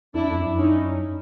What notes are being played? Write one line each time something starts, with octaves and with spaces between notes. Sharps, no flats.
F2 D4 E4
F2
F#2
C#4 D#4